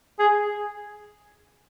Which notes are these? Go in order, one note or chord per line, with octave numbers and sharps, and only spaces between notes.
G#4